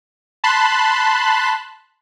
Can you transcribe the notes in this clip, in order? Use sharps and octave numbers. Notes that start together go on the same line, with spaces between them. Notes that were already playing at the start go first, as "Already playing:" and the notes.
A5 B5 C6 F#6